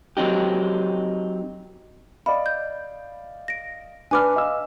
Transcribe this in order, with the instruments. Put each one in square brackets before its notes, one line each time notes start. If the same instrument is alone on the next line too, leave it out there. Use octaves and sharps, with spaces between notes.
[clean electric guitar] F#3 C4 D#4 G4
[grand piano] D5 D#5 F5 [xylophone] B5
[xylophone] G6
A#6 D7
[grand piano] D4 B4 B5 [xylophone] G#5 D6 F6
[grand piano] D#5 F5 E6